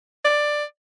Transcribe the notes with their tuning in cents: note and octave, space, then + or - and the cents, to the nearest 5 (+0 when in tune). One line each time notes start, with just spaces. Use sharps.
D5 +10